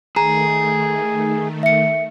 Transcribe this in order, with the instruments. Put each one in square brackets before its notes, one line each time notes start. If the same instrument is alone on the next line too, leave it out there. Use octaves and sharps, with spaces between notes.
[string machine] D#3 A3 [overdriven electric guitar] G#4 [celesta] A#5
[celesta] E5 C#7